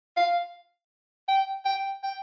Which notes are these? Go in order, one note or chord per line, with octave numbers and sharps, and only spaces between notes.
F5
G5
G5
G5